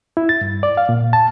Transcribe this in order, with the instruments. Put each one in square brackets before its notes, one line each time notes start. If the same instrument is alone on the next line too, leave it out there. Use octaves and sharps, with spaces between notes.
[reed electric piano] E4
A6
G2
D5
F5
A#2
A5